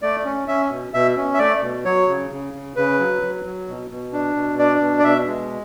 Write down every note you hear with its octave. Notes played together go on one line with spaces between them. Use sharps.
A3 D5
C#4
C#4 E5
B2
B2 E5
C#4
E5
A3 D5
B2
F#3 C#5
C#3
C#3
C#3
C#3 B4
F#3
F#3
F#3
B2
B2
D4
B2
D4 D5
B2
D5
B2 E5
G#3